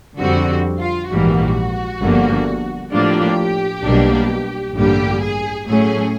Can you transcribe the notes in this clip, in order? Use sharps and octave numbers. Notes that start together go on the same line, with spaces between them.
F2 D3 G3 C4 F#4
F4
A#1 G#2 E3 G3 A#3 F#4
G1 G2 D3 F3 A#3
A2 F3 A#3 D4 F4 G4
B1 B2 G3 A#3 D4
A1 G2 D3 G3 A#3 G4
G#4
A2 F#3 A3 C#4 G#4